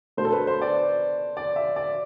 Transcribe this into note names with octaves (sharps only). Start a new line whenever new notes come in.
B2 A3 D4 C5
A4
B4
C5
D5
D5
E5
D5